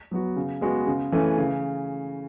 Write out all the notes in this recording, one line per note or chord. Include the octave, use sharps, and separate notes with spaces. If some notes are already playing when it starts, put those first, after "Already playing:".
F#3 B3 F#4
C#3
G#3 B3 F#4
C#3
E3 A3 C#4
C#3